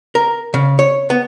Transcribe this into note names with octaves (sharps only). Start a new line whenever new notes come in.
A#4
C#3
C#5
B3